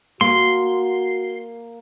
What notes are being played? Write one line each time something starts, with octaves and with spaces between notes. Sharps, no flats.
A#3 F#4 C6